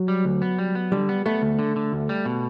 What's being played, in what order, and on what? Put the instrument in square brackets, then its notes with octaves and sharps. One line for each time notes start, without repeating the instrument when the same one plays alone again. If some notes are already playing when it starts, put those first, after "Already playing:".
Already playing: [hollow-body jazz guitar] F#3
[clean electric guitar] G3
D2
B3
G3
B3
[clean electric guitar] D3 [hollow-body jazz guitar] G3
[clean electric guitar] B3
[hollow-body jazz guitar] A3 [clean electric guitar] B3
[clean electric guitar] D2
D3
D3
D2
G3
B2